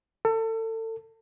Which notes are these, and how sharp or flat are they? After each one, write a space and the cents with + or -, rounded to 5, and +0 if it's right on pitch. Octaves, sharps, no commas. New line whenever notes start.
A4 +30